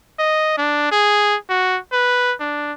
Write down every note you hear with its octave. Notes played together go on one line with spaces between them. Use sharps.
D#5
D4
G#4
F#4
B4
D4